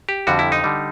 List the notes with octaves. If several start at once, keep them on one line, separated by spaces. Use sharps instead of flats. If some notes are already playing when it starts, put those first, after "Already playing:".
G4
F2 D3 G3 F#4
E4
D#4
D3 G3